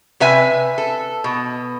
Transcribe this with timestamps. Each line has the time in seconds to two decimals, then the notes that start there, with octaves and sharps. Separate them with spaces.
0.20 C3 B4 E5 G#5
0.78 A4
1.24 B2